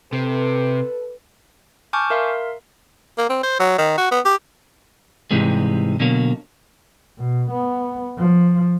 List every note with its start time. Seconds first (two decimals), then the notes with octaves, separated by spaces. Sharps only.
0.13 C3 A4 B4
1.93 G#5 A5 C#6 D6 F6 G6
2.10 A#4 E5 F5 C6
3.18 A#3
3.29 C4
3.43 C5
3.60 F#3
3.78 D#3
3.98 F#4
4.11 B3
4.25 G4
5.31 G#2 C3 E3 G3 G#3
6.00 B2 D3 F#3 A#3
7.18 B2
7.50 B3
8.18 F3